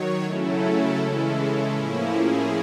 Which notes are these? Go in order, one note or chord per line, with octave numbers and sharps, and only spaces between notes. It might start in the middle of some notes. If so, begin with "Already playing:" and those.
Already playing: D#3 F#3 C#5
C#3 F#3 A3 C#4 E4 A4
A4
C#3 E3 G#3 C#4 E4
A2 F3 A#3 C#4 E4
G#4